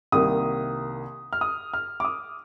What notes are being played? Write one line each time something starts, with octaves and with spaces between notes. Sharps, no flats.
C2 C3 D#3 A#3 D#6
F6
D#6
F6
D6
D#6